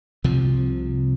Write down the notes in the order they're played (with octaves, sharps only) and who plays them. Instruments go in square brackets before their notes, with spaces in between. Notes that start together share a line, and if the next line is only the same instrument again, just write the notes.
[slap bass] C2 C3 F3